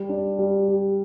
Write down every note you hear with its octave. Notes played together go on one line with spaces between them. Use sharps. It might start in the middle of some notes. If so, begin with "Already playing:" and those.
Already playing: G3
D4
G3
G4